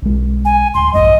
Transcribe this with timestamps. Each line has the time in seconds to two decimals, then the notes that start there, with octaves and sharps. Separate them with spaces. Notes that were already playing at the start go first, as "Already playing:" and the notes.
0.02 B1 G#3
0.45 G#5
0.74 D1 C6
0.94 A#1 E2 G2 D#5